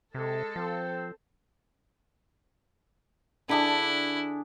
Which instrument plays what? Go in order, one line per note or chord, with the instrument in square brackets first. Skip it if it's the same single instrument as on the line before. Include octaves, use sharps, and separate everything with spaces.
[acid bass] C3 [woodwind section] G#3 [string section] A4
[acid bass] F3 [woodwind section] C4 C5
[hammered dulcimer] D3 D4 G#4 [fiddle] E4